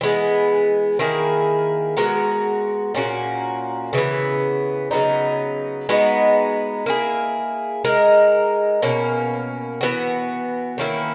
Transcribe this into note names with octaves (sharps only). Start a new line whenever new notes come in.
E3 G#3 B3
D#3 A#3 E4 G#4
G#3 B3 F#4 A#4
A#2 A#3 C#4 F#4
C#3 E3 B3
C#3 F#3 B3 D#4
G#3 B3 D#4 F#4
A#3 E4 G#4
G#3 D#4 A#4
B2 A#3 C#4
E3 B3 F#4
D#3 A#3 C#4 E4